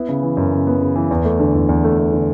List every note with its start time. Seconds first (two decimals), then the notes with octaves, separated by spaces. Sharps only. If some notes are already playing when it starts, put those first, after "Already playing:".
Already playing: B3 E4
0.09 C#3
0.23 E3
0.37 F#2
0.52 C#3
0.67 B3
0.82 C#3
0.96 E3
1.11 E2
1.25 A3
1.39 D3
1.55 E2
1.69 E2
1.84 A3
1.99 A3
2.12 D3